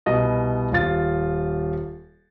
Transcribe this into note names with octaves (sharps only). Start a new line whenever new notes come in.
C2 B2 D#5 D#6
D#1 F4 A6